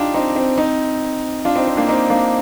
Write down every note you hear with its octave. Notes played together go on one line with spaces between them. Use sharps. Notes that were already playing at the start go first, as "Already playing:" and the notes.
Already playing: D4 D#4 F4 G4
C4 D#4
C4
C4 D#4
D4 F4
C4 D#4
C4
A#3 D4
F4
C4 D#4
A#3 D4